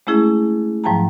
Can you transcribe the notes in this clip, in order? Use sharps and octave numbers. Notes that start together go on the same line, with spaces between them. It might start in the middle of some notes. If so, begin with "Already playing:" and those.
G#3 A3 C#4 E4 G#4
G#2 F3 F#3 G5 A5 A#5